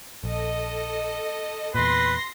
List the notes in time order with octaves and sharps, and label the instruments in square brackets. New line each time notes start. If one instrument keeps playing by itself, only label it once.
[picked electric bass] A#1 [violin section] A4 D#5
[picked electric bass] E2 A#2 [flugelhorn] B4 [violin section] C6 A#6